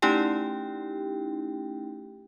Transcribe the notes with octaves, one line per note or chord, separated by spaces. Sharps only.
A3 C#4 D#4 E4 G4 G5